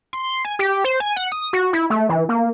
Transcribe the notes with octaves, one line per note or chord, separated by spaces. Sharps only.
C6
G#5
G4
C5
G#5
F#5
D#6
F#4
E4
A3
E3
A#3